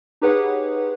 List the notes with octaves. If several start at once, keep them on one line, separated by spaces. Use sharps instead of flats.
D#4 G4 G#4 B4 C#5 F#5